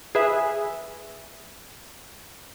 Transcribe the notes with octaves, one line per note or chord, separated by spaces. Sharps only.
G#4 B4 E5